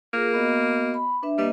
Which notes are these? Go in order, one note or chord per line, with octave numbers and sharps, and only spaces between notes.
A#3 F4 G#4 A#4
B3 F#4 D#5
B5
D4 B4 E5
G3 A#3 B4 D#5